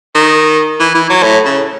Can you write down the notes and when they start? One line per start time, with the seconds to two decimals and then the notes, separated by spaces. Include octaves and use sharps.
0.15 D#3
0.80 E3
0.95 E3
1.09 F#3
1.23 A2
1.45 C#3